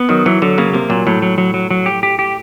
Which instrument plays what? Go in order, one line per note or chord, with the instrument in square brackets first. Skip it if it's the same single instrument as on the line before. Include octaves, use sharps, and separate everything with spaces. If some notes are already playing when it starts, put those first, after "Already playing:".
Already playing: [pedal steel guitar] B3
[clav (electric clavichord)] D#3 [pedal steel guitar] F#3
[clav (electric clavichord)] E3 [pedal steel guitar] F#3
[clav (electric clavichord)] D3 [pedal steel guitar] F#3
[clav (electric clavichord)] C#3 [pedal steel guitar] A#3
[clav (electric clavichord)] C3 [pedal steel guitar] A#3
[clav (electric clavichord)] A#2 [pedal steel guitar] F#3
[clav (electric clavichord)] A2 [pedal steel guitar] F#3
[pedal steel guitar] F#3
F#3
F#3
F#3
G4
G4
G4